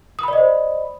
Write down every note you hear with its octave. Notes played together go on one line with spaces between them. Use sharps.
C5 D5 D#5 B5 D#6